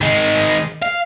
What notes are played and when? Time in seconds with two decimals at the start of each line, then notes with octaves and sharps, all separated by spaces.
0.01 D#3 G#3
0.83 F5